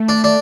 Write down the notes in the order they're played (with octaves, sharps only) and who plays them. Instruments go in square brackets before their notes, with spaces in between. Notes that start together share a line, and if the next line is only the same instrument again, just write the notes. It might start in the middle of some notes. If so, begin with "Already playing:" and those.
Already playing: [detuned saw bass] A3
[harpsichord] D4
D4